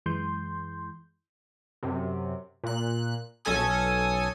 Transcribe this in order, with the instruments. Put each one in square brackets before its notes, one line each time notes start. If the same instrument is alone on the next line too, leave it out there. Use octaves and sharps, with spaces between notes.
[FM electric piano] F#2 E3 G#3 C6 G6
[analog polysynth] F#2 C3
A#2 F#6
B1 C#4 A4 G#5 D#6